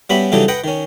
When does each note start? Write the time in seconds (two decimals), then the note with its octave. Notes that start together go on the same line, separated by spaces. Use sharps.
0.10 G3 B3 C#4 F#4 E5 B5
0.32 C#3 E3 F#3 G3 D#4 A4
0.48 B4 D#5 F#5 G5
0.64 D#3 C#4